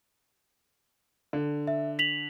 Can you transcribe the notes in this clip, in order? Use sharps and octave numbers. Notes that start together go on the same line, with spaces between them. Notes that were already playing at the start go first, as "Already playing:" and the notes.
D3
E5
B6 F7 F#7